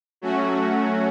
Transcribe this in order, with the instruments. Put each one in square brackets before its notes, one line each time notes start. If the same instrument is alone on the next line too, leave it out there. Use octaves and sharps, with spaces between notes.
[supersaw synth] F#3 A3 C#4 F#4